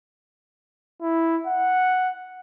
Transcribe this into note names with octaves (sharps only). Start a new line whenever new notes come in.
E4
F#5